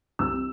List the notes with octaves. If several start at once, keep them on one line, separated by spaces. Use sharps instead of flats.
C2 E6